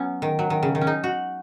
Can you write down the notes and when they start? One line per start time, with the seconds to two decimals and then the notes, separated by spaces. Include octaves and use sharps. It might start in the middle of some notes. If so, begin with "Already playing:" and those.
Already playing: F#3 B3 C#4
0.22 D#3
0.39 F#3
0.50 D#3
0.63 C#3
0.75 D#3
0.81 C#4
0.87 D#4
1.04 F#4